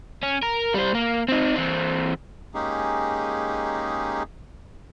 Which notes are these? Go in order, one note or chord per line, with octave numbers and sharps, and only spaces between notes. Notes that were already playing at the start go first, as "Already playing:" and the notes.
C#4
A#4
G3 C5
A#3
C4 D#4
E3 C4
G#3 A#3 C#4 D#4 G4 G#4